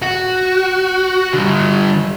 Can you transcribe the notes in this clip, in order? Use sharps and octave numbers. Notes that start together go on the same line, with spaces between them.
F#4
D3 G3